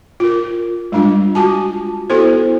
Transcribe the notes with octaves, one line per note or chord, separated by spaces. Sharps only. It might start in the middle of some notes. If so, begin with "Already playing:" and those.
F4 A#4
G3 G#3 D4 F4
F4 F#4 G#5 A5
B3 E4 F#4 A4 C5